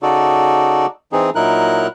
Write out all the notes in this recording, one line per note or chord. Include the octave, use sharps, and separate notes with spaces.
C#3 D#4 F#4 A4 D5
E3 C4 D#4 G#4
A#2 F#3 D#4 E4 A#4 F#6